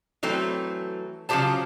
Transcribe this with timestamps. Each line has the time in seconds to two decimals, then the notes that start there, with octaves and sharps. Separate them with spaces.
0.23 E3 F#3 A3 C4
1.29 C#3 F3 F#3 G4 C5 A5